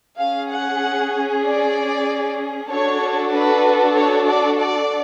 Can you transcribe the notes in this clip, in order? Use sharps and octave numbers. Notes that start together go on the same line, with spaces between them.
C#4 G#4 F5
F#5
D5
D4 F#4 A4 C#5
B4
C#5
D5
D5